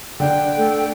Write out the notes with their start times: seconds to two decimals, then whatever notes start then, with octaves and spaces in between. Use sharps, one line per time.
0.20 D3 D4 G5
0.57 A3 A4